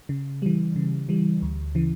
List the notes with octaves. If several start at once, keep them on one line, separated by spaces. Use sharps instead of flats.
C#3
E3 G3
C#3
E3 G3
D2
C#3 E3